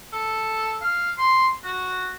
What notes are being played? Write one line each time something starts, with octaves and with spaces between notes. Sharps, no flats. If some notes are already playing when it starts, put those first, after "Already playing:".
A4
F5
C6
F#4